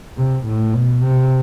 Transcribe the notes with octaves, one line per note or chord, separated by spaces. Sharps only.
C3
A2
B2
C3